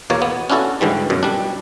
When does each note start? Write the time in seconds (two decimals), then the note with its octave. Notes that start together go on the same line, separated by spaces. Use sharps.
0.10 E2 B2 A#3 C#5
0.22 B3
0.50 C#4 D4 E4 F#4 A4
0.81 G#2 D3 E3 G3
1.10 F#2 B2
1.23 G3 D4